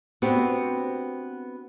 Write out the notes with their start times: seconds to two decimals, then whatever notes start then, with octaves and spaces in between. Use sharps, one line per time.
0.22 B3 C4 D4 F#4 G4 C5